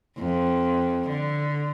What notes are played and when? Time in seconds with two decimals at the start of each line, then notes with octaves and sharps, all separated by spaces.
0.18 F2
1.08 D3